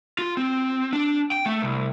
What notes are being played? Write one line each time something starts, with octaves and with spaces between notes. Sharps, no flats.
F4
C4
D4
G5
A3
C2